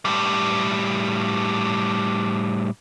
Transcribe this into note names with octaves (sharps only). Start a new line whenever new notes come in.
A2 G3